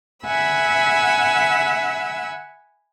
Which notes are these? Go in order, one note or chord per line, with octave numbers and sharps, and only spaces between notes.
E5 F#5 G#5 B5 E6